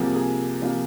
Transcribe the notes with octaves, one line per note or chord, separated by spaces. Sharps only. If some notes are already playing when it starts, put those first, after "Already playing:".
Already playing: C2 C3 F3 A#3 G#4
G#4
C3 F3 A#3 F4